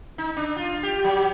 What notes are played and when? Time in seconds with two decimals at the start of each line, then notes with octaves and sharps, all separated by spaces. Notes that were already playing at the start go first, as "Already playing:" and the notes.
0.18 D#4
0.37 D4
0.56 F4
0.83 G4
1.04 F#3